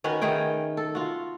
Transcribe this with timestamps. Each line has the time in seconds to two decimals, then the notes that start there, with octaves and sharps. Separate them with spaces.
0.04 D#3 C#4 F#4 B4
0.22 D#3 A3 G#4 G5
0.77 A4
0.95 F4 F#4